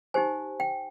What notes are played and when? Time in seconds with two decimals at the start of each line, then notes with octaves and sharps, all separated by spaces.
0.14 D#4 G4 C5 G#5
0.60 G5